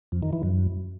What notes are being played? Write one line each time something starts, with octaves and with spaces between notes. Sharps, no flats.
F2
D#3
E3
F#2